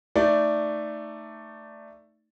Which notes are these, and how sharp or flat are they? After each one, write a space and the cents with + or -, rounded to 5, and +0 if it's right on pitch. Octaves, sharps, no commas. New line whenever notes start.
A3 +10 D#4 +0 D5 +0